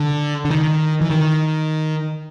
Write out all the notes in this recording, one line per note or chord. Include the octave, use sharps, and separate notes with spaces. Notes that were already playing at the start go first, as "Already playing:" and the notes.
Already playing: D3
D3
D#3
E3
D#3